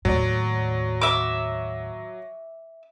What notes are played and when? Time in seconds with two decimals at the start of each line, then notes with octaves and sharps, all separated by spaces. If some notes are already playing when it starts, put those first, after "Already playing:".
0.05 D#2 A2 F#3 D5
1.02 E5 D6